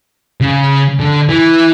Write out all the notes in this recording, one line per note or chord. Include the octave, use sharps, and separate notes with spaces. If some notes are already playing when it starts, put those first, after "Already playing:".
C#3
D3
E3